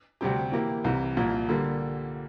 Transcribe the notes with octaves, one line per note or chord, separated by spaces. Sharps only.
D2 C3 G3 C4 G4
E3 A#3 E4 G4
C2 C3 E3
C2 A#2 F3
D3 G3 A#3